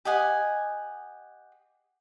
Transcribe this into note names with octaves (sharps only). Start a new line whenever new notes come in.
G4 D#5 F#5 G#5